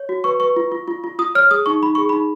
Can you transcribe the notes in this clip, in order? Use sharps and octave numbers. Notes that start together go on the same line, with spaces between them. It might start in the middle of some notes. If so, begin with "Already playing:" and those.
Already playing: C#5
F#4
B4 C#6
B4 C#6
F4
F4
F4
F4
F4 D#6
C#5 F6
G#4 D#6
D#4 C#6
D#4 B5
G#4 C#6
D#4 B5